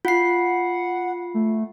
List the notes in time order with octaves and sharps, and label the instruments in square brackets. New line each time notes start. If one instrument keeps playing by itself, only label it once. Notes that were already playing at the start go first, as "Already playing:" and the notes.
[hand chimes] F4 C7 [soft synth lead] F#5
[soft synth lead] A3